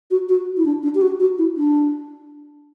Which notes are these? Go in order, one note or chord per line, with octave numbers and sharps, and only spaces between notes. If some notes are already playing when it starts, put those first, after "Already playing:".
F#4
F#4
E4
D4
D4
G4
F#4
F#4
E4
D4